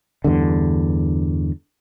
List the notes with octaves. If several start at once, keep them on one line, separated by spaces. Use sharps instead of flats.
E2 G2 D3